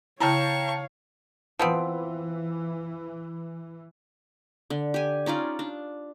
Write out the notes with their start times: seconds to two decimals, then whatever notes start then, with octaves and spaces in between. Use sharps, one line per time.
0.20 C#3 E4 C#5 F5 G5 A5 A#5 C#6
1.59 E3 F3 B3 C4
4.70 D3
4.94 G4 G#5
5.26 C#4 D#4 F4 D5
5.59 D4